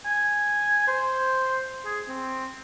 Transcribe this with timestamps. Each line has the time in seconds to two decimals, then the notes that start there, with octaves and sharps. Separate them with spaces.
0.05 G#5
0.88 C5
1.85 G#4
2.09 C4